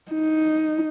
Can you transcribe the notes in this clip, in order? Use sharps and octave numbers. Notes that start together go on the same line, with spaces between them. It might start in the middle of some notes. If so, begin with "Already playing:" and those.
D#4